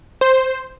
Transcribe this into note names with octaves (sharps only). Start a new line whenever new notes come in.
C5